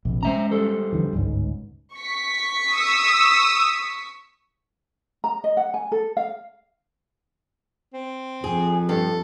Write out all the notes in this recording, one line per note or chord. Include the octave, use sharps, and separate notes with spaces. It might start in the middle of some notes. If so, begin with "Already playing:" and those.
A#1 F2 C3
G#3 A3 C#4 C5 E5 A#5
G3 A4 C5
F2 D3 E3
G1 C#2 G#2
C#6 B6
D#6 E6
A#5
D#5
F#5
G#5
A4
F5
C4
F2 G#4
G2 A4